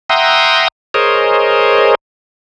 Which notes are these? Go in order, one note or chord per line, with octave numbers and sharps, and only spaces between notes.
E5 F#5 G5 A#5 C6 D#6
G#4 A#4 C5 C#5 D#5